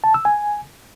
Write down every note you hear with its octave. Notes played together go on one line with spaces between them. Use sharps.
A5
E6
G#5